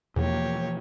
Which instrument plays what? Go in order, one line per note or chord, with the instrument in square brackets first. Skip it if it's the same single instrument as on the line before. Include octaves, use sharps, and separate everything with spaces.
[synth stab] E2 [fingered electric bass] B2 E3 F3 [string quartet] A#3 G4 C#5